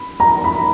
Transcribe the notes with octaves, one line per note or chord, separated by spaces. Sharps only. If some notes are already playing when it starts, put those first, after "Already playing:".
Already playing: B5
A#5
B5